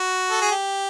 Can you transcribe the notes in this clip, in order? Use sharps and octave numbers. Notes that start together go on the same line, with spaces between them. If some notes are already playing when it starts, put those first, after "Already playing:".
Already playing: F#4
A4
G#4
G4